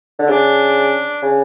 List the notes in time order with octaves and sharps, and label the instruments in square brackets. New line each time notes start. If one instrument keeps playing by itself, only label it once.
[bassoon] D3
[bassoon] C#3 [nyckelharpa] D4
[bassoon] C#3